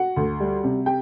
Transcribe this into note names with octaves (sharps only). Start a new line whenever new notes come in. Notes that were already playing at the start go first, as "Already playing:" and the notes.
Already playing: F#4 F#5
D2
G3
C3
G4 G5